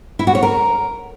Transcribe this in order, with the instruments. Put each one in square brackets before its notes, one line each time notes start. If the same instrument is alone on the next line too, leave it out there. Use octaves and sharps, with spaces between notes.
[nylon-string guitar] E4
F#4
C#5
A#4